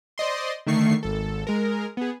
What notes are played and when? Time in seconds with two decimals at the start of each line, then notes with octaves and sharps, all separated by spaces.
0.18 C5 D5 D#5 C6
0.67 D3 D#3 A3 C#6 C7
1.03 G#1 A4
1.47 G#3 A#4
1.97 B3 G#4